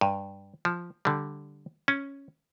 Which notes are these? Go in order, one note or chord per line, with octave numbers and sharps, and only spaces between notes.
G2
F3
D3 G3
C#4